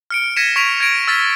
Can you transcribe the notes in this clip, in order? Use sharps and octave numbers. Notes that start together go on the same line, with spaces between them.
F6 C#7 D7
G#6 A#6 B6 C#7 D#7 E7
C#6 G#6 B6 D7 F7
G#6 A#6 D7
E6 F6 A6 B6